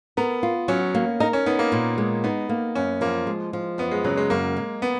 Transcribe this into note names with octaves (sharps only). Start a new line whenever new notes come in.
B3 A#4
F4
F#3 C#4
A#3
D#4 A#4
C#4
B3 D#4
A#3
A#2
G#3
B3 D#4
A#3
F#2 C#4
F3 A#3
G#3
F3
F#2 B3
G#3
C#3 F#3
G#3
F#2 A#3
G#3
B3